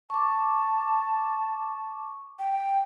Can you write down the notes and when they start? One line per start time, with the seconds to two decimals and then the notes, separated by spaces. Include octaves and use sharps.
0.10 A5 C#6 D6
2.39 G5